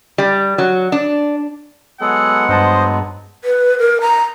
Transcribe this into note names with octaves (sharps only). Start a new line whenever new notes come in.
G3
F#3
D4
F#3 G#3 B3 G#4 A4 F#5
G2 C5 D#5 A5
B4
A#4
A#5